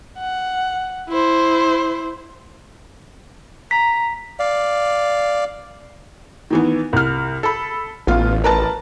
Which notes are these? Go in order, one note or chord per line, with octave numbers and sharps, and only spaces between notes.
F#5
E4 C5
A#5 B6
D5 F5
D#3 E3 B3
C2 F6
A4 B5
A1 B3 F4
A#4 B4 A5